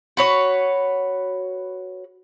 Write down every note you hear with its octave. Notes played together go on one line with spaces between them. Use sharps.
F#4 B4 C#5